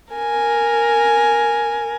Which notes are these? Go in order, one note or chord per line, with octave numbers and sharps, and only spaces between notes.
A#4 G#5